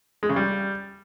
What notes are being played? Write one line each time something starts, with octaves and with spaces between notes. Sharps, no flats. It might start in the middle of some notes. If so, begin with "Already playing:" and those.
G#3
C#3
G3